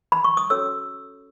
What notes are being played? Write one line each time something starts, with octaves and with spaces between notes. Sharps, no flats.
B5
C#6
D#6
C#4 F#4 A4 C#5 E6